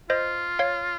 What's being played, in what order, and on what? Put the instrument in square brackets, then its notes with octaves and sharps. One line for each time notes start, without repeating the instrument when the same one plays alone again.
[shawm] F4 [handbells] C5 D#5
[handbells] C#5 F5